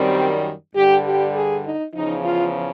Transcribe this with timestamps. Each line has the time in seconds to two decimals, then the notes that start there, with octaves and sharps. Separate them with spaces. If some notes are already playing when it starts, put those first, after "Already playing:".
Already playing: F#2 D#3 G3 C4
0.76 G2 D3 G3 G4
1.05 G4
1.35 G#4
1.65 D#4
1.94 E2 C#3 F3 D#4
2.25 F4